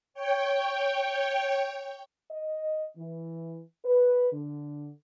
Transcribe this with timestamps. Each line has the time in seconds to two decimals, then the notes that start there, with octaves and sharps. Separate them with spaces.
0.14 C#5 G5
2.31 D#5
2.96 E3
3.85 B4
4.32 D3